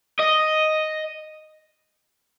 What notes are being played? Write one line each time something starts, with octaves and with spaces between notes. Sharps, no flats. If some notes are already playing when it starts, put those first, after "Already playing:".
D#5